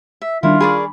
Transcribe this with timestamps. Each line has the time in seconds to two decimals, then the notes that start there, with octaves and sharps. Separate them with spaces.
0.22 E5
0.43 D#3 G3 D4 E4 F4
0.60 G#4 A#4 D5 B5 C#6